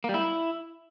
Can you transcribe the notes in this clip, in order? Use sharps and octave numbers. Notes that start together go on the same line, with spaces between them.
A#3
G3
E4